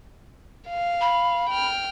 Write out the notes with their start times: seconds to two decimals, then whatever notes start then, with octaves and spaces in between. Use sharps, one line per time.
0.68 F5
1.01 B5
1.49 G5 F6